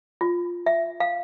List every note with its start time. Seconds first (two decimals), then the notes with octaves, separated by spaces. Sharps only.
0.21 F4
0.66 E5
1.00 F5